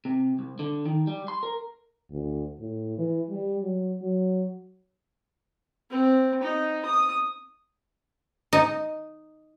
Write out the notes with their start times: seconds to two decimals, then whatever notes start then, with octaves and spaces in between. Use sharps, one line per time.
0.05 C3
0.39 C2
0.59 D3
0.86 D#3
1.07 G3
1.28 C6
1.43 A#4
2.11 D2
2.59 A2
2.98 E3
3.30 G3
3.63 F#3
4.02 F#3
5.91 C4
6.43 D#4
6.85 D#6
8.53 D#4